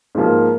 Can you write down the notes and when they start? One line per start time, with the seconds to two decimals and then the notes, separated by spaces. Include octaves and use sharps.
0.15 G#2 F3 A#3